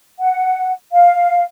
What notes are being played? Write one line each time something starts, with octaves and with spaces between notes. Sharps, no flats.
F#5
F5